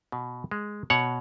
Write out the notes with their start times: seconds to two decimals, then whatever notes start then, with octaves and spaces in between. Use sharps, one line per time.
0.12 B2
0.51 G#3
0.90 B2 C#5 F#5